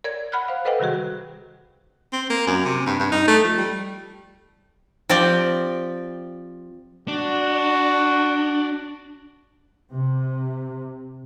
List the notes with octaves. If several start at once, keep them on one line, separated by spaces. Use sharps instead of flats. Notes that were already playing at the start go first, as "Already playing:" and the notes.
A#4 C#5 D5 G#6
F#5 B5 F6 F#6
C5 F5
A4 B4 C5 D#5 F#5 G5
C3 D#3 G3 F#4 G#4
C4
A#3
F#2
C3
G2
G2
D#4
A3
F3
G3
F3 C4 G4 D5 G5
D4 F#4
C3